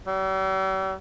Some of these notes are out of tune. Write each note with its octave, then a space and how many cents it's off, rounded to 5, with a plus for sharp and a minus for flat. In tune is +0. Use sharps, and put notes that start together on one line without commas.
G3 -45